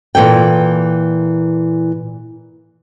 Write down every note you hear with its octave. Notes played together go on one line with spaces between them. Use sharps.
A#2 E3 A4 G5